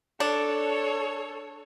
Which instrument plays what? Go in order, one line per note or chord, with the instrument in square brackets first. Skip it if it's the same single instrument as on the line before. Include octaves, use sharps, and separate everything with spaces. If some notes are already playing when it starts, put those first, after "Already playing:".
[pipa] D4 [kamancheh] A4 [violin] C#5